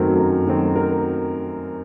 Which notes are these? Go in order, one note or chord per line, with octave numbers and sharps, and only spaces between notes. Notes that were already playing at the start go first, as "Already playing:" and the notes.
Already playing: F#2 D#3 F#3 A3 C4 A#4
F#2
D#3 F#3 A3 C4
A#4